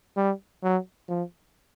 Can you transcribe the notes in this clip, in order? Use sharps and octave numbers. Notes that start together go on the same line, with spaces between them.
G3
F#3
F3